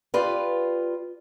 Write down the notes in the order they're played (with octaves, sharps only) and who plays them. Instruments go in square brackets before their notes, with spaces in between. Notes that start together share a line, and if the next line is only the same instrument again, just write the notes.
[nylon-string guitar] F4 G4 B4 D5 F5